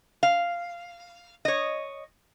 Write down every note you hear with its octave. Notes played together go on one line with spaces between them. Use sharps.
F5
C#5 D#5